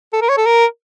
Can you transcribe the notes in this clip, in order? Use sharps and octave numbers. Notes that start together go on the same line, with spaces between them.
A4
A#4
C#5
A4
A#4